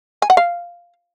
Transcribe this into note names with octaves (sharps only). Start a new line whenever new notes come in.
G#5
F#5
F5